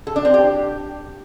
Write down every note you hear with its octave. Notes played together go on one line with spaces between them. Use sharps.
A4
D4
C4
G4